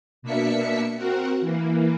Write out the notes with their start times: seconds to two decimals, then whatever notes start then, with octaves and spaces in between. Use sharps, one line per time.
0.22 B2 A#3 D4 E5 B6 C#7
0.97 C4 F#4 A#4 F#5
1.41 E3 A#3